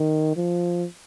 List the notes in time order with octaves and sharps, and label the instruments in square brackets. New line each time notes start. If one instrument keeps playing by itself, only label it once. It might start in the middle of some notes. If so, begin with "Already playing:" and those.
Already playing: [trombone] D#3
F3